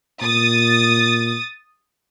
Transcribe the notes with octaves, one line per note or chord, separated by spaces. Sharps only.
A#2 D#6 A6